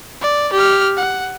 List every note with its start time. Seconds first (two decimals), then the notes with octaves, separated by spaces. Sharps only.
0.21 D5
0.53 G4 F6
0.97 F#5